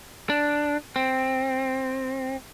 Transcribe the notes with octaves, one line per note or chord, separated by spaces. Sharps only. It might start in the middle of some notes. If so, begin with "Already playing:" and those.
D4
C4